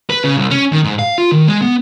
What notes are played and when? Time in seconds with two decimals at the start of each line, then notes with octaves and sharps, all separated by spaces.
0.10 B4
0.24 C#3
0.37 C2
0.51 C#4
0.72 D#3
0.84 G#2
0.99 F5
1.18 F4
1.32 D#3
1.47 G#3
1.62 B3